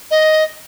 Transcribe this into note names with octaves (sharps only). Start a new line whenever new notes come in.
D#5